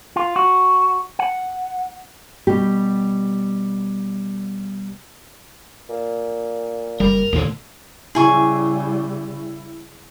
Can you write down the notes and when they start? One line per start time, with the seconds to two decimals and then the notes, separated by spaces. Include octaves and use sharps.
0.16 F4
0.36 F#4
1.19 F#5
2.47 B2 G3 G4
5.89 A#2
7.00 F#1 G3 A#4
7.33 D#2 A#2 D3 A3 C5
8.15 C#3 G3 E4 G#4 G#5 C#6